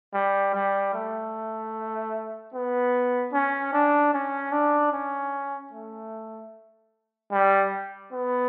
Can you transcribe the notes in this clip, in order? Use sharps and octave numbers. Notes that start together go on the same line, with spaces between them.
G3
G3
A3
B3
C#4
D4
C#4
D4
C#4
A3
G3
B3